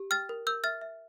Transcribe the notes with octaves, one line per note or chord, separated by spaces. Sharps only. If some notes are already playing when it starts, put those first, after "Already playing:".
Already playing: G4
G5 F6 A6
A#4
A#4 E6 G6
E5 F6 A6
E5